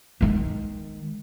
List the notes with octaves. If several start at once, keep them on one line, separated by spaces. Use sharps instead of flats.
D#3 G#3